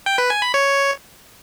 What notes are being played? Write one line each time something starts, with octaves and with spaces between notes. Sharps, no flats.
G5
B4
G#5
B5
C#5